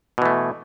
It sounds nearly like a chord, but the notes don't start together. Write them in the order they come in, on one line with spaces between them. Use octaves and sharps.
B2 E3 A3